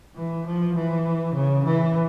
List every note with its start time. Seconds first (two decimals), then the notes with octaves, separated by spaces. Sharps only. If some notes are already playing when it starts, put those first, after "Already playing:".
0.16 E3
0.46 F3
0.75 E3
1.34 C#3
1.64 E3